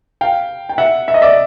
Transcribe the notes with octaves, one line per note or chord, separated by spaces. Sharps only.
F5 G5
G5
E5 F#5
E5
D#5
D5 E5